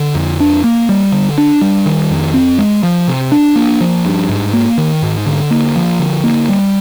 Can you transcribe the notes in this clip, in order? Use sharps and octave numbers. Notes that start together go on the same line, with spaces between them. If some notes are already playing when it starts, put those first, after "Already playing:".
Already playing: D3
F2
D4
A#3
G3
D3
D4
G3
D#3
F2
C4
G#3
F3
C3
D4
A#3
F3
G2
G#2
A#3
D#3
G#2
D3
A#3
F3
D3
A#3
G3